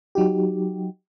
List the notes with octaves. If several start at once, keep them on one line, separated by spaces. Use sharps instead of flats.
F#3 D#4 F#4 G4